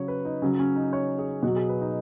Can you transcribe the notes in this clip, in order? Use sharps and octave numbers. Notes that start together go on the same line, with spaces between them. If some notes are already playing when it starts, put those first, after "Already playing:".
Already playing: C#3 F#3 C#5
B4
D#4
C#3 F#3 C#4
C#4
D#4
C#5
G#4
B2 F#3 F#4
G#4
B4
D#4